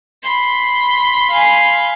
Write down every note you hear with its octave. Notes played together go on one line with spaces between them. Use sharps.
B5 C6
F5 G#5